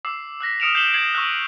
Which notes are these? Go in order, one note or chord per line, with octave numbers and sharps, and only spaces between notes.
D6 E6 C7
E6 F#6 A#6 B6
D#6 F6 C#7 D7 E7 F7
G6 C7 E7 F#7 G7
G#6 C7 F#7
C#6 E6 F#6